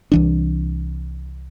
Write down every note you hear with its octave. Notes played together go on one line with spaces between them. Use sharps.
C2 E3 D4